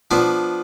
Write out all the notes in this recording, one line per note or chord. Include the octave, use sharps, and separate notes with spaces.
F3 B3 D4